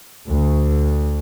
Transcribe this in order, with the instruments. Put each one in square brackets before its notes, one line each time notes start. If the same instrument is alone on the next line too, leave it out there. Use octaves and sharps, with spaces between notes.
[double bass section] D2